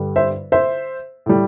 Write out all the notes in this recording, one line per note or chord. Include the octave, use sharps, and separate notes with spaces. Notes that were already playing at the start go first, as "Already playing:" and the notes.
Already playing: G2 D3 G3
C5 E5
C5 E5
A2 G3